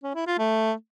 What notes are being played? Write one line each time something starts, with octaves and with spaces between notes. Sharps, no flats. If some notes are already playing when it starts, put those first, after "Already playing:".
C#4
E4
F4
A3